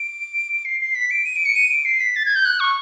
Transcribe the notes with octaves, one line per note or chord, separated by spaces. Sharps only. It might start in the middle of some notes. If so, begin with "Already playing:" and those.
Already playing: D7
C7
C7
B6
D7
D#7
D7
C#7
D#7
D7
C7
B6
A6
G#6
G6
F#6
C#6